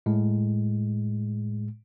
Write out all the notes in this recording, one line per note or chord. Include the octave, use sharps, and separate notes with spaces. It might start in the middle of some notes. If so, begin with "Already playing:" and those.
A2 G#3